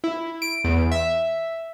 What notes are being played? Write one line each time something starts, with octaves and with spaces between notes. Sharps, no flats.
E4
D7
E2
E5